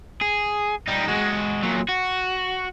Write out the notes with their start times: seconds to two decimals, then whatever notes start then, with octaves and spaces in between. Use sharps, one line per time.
0.21 G#4
0.87 G3 D#4
1.08 G#3 F#4
1.63 A#2 F#3
1.89 F#4